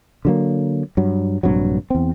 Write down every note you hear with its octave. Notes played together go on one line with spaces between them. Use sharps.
D3 F#3 A#3
G2 F#3
A#1 G2 C3 F#3
E2 C4